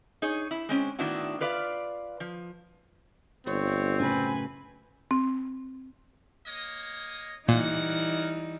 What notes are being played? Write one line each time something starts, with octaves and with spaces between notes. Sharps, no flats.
D#4 G#4 C#5
E4
G#3 C4 C#4
A2 D#3 B3 D4 E4 F#4
F4 B4 D5 E5 F5
F3
G1 C4 C#5
F#2 A2 C#3 B4 G#5
C4
A#3 C#5 D#5
A#2 E3 G3 D#4 A#4 C#5 F#5